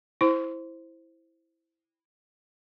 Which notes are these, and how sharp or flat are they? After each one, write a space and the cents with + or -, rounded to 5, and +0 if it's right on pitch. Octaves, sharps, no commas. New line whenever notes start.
E4 +0 C5 +0 C6 -30